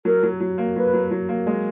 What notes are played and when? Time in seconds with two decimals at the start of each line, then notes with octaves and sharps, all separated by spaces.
0.05 F#3 A#4
0.23 F#3
0.40 F#3
0.58 A#3
0.76 F#3 B4
0.93 F#3
1.11 F#3
1.29 A#3
1.47 G#3